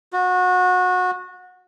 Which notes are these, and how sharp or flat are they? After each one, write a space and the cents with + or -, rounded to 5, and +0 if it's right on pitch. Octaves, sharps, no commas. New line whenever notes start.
F#4 -25